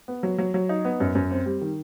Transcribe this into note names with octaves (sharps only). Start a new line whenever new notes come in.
B3
F#3
F#3
F#3
D#4
B3
F#2
F#2
C4
G3
D#3